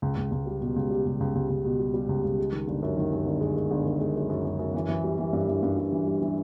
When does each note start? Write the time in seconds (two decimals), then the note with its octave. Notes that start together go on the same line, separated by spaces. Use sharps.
0.02 C#2
0.17 C#2
0.31 C#2
0.47 G3
0.61 B2
0.76 C#2
0.90 G3
1.05 C#2
1.20 C#2
1.35 C#2
1.50 C#2
1.65 B2
1.79 G3
1.94 G3
2.09 C#2
2.24 C#2
2.38 G#3
2.52 D#3
2.68 G1
2.82 F#2
2.97 D#3
3.12 F#2
3.26 G1
3.41 G#3
3.56 G#3
3.71 G1
3.86 D#3
4.00 G#3
4.16 F#2
4.29 F#2
4.45 F#2
4.59 F#2
4.74 E3
4.89 E3
5.04 G3
5.18 E3
5.33 G2
5.48 E3
5.62 G2
5.77 G2
5.92 E3
6.07 G3
6.22 E3